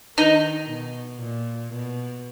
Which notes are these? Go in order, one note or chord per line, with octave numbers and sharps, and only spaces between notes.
D#3 D#4
B2
A#2
B2